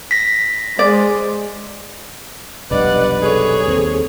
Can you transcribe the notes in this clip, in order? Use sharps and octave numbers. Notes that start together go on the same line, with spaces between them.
A#6 B6
G#3 C5 D5
F1 B1 G2 B4 D5 D#5 F#5
G#4 A4 C#5
G1 D#2 C4